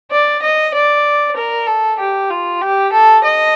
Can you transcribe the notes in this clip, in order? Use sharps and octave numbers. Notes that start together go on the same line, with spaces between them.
D5
D#5
D5
A#4
A4
G4
F4
G4
A4
D#5